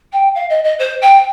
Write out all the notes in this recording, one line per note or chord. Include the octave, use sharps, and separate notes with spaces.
G5
F5
D#5
D#5
C5
G5